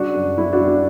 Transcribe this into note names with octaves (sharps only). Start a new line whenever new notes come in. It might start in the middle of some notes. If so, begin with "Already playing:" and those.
Already playing: C#3 G3 D4 F#4
F#2
F#2 E4
D4 F#4
G3
D4 F#4